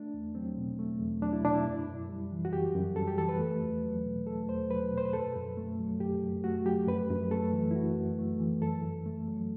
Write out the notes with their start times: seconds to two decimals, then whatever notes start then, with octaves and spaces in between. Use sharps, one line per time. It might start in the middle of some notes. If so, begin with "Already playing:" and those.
Already playing: A3 D4
0.14 E2
0.35 F#3 C4
0.57 B2
0.79 A3
1.00 E2
1.22 F#3 D4
1.33 E4
1.45 B2 D4
1.55 E4
1.66 F#2
1.87 F#2
2.09 G3
2.32 E3
2.45 F#4
2.53 F#2 G4
2.75 F#2
2.96 G3 A4
3.07 G4
3.18 E3 A4
3.29 B4
3.39 A3
3.62 E2
3.83 F#3
4.05 B2
4.26 A3 A4
4.48 E2 C5
4.70 F#3 B4
4.92 B2
4.98 C5
5.05 B4
5.13 F#2 A4
5.36 F#2
5.57 A3
5.80 F#3
6.00 F#2 G4
6.23 F#2
6.44 A3 F#4
6.66 F#3 G4
6.87 F#2 B4
7.10 F#2
7.31 A3 A4
7.53 E3
7.71 E4
7.75 F#2 F#4
7.97 F#2
8.19 A3
8.40 E3
8.62 F#2 A4
8.83 F#2
9.06 A3
9.28 F#3